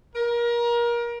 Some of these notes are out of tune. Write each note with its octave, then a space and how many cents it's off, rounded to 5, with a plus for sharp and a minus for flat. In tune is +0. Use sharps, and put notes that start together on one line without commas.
A#4 +30